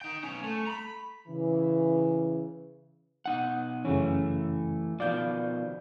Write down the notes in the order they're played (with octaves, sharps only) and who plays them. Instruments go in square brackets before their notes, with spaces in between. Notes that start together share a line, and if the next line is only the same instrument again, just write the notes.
[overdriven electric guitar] D#4 G5
B1 C#4
A3
A#5 B5
[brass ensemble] C#3 E3
[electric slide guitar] B2 D#4 F#5
[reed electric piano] F#2 C#3 C#4 [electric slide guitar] E3 A3
[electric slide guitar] B2 D#3 F3 [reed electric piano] D5 F5 G6